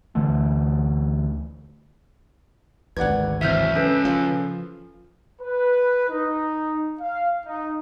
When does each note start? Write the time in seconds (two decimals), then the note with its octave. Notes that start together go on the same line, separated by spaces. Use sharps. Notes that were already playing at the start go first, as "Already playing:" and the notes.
0.15 D2 D3 E3 A3
2.97 G#1 D2 B4 D5 F#5 G#6
3.41 C#2 E3 F#3 C4 E5 F6 G6
3.75 C#4 A4 B4
4.05 F3 F5
5.40 B4
6.08 D#4
7.00 F5
7.46 D#4